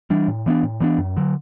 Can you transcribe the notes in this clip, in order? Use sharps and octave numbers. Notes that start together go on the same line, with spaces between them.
E3 G3 D4
A2
E3 B3 D4
A2
E3 B3 D4
F#2
D3 F#3